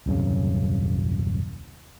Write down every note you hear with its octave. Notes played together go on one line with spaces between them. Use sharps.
D#1 C2 F#2 C#3